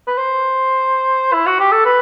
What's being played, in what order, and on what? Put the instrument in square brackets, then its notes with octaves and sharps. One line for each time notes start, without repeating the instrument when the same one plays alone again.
[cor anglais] B4
C5
E4
F#4
G4
A4
B4